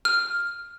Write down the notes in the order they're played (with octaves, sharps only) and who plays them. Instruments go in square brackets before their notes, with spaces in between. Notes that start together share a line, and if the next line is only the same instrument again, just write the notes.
[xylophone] F6